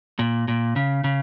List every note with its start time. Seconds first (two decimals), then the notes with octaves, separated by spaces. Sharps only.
0.19 A#2
0.48 A#2
0.76 C#3
1.04 C#3